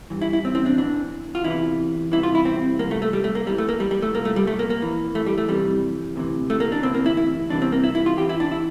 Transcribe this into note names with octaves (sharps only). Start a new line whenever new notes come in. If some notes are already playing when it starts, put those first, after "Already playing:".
G2 E3
E4
E4
C4
C4
D4
E2 E3 D4
F4
E2 C3 E3 E4
C2 C3 E3 E4
F4
E4
C4
C2 A#2 A#3
A3
A3
G3
A3
A#3
E2 E3 G3
A3
A#3
G3
G3
A3
C2 A#2 A#3
A3
G3
A3
A#3
A#3
F2 E3
A3
G3
A3
F2 C3 E3 G3
D2 C3 E3
A3
A#3
D4
D2 C3 E3 C4
A#3
E4
E4
C2 C3 E3 D4
C4
A#3
E4
E4
F4
E2 E3 G4
E4
D4
E4